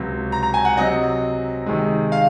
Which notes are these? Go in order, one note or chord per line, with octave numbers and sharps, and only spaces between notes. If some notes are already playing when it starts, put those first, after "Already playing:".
Already playing: C#2 C3 F#3
A#5
A#5
G#5
F#5
C3 F#3 C4 D#5
C3 D#3 G#3
F5